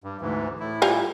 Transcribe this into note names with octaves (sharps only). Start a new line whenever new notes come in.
G2
D2 G#2 E3
A2 E4
G3 F4 G#5